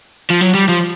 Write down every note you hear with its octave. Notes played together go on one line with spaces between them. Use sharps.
F3
F#3
G3
F3